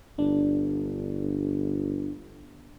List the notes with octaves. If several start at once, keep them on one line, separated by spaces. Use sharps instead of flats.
G1 D4